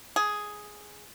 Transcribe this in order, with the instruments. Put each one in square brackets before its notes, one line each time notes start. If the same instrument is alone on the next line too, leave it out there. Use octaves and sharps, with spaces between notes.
[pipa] G#4